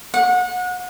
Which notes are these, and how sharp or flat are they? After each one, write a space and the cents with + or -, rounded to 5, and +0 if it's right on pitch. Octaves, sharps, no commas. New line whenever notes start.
F#5 -30